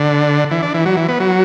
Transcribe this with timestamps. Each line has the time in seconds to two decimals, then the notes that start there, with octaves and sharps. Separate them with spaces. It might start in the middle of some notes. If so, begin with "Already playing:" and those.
Already playing: D3
0.51 E3
0.62 D4
0.74 E3
0.85 F#3
0.97 E3
1.08 B3
1.20 F#3